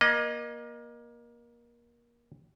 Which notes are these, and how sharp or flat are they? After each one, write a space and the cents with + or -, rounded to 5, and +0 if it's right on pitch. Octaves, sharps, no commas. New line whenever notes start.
A#3 +25 D#5 -20